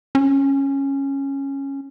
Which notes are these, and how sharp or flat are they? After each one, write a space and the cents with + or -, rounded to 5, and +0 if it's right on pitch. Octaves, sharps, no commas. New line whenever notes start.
C#4 -10